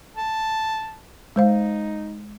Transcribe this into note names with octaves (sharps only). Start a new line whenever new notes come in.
A5
G#3 D#4 C5 F5